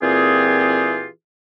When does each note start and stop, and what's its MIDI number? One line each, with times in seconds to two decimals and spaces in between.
0.03 1.07 46
0.03 1.07 52
0.03 1.07 60
0.03 1.07 65
0.03 1.07 67
0.03 1.07 68